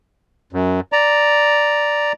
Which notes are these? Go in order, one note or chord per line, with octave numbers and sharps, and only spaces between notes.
F#2
D5 A#5